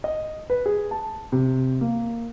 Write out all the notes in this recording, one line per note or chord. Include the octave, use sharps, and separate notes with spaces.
D#5
B4
G#4
A5
C3
A#3